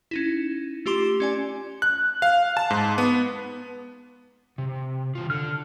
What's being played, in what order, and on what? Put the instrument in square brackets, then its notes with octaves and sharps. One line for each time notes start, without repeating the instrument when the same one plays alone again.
[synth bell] C#4 D#4 E4
A3 F4 G4 C6 D6 E7
C#4 D5 G#5
[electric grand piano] F#6
F5
A5
G#2
B3
[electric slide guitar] C3
D#3 F4
[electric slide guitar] D3 [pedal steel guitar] F6